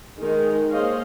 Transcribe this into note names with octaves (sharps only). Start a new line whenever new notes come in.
D#3 G#3 D#4 A#4
A#3 G#4 C5 C#5 D#5 F5